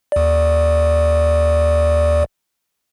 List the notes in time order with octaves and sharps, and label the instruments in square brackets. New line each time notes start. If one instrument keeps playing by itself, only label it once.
[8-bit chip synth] D#2 D5